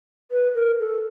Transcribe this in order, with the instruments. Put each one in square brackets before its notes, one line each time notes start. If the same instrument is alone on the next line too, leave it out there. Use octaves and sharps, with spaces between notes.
[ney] B4
A#4
A4